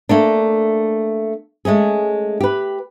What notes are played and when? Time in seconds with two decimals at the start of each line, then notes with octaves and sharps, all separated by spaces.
0.09 A3 A#3 D4
1.65 G#3 A3 C#4 G#4
2.41 G4 B4